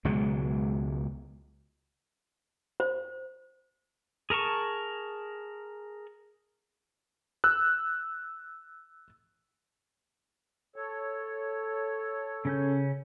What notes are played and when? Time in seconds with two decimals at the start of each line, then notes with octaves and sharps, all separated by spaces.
0.05 C#2 B2 F#3 G#3
2.80 C5
4.30 G#4 A#4 A5 C#6
7.44 E6 F#6
10.76 A4 C#5
12.45 C#3 C#4 G6